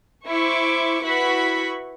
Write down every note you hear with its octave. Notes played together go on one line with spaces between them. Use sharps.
E4 C5 C#6 D6
E4 F#4 B4 B5 C#6 B6